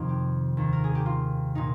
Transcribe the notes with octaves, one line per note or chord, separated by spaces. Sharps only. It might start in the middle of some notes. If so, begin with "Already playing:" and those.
Already playing: F2 C3 D#3
G4
D#2 D#3
A#4
G#4
G4
F4
A#2 D#4